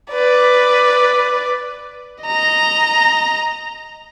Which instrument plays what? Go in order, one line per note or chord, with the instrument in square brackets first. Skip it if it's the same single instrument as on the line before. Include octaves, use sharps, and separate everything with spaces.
[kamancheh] B4 D5
[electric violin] D#5 A#5